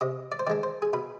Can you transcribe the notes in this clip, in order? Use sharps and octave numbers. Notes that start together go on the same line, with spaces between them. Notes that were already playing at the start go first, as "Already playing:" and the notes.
C3 D#5
D5
C5
D#3 G#3 D4 D5
C5
G#4
B2 B4